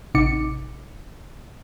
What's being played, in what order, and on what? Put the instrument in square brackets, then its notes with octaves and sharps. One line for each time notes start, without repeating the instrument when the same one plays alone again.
[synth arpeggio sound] A1 C3 D#4 D6 C#7